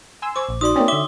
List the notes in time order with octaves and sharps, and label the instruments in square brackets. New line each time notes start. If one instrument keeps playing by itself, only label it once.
[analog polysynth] G#5 C6 E6
[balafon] C5 C#6 [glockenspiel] D6
[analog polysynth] A#1
[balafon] D#4 F#4 D5 [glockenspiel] C6 D#6
[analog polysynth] A#3 C4 C#4 [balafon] C#5 D5 G5
[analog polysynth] D3 E5 [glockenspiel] D6 G7